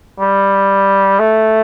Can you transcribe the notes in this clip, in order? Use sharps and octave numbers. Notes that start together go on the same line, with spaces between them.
G3
A3